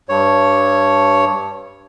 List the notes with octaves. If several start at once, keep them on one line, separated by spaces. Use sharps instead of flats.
G2 C#5